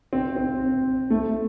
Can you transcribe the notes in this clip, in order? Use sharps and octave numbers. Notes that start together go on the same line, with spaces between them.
C4
C4
A3